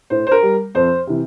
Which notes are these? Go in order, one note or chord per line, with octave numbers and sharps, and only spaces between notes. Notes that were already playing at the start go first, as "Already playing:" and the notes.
A2 C5
C5
A#4
G3
F2 C5
C3 E3